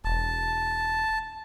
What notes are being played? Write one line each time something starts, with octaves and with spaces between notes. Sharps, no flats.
E1 A5